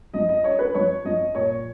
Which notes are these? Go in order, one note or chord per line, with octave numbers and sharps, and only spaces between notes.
F3 D#5
D#5
C#4 C#5
B4
F3 C#5
F3 D#5
A#2 C#5